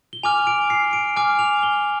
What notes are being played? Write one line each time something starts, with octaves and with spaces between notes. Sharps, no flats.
G7
G#5 D6 F6 F7
D7
C7
D7
G#5 D6 F6
F7
G7